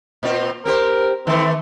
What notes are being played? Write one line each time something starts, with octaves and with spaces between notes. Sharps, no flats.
A#2 C4 F4
C4 G4 A#4 C5
D#3 E3 A3 C4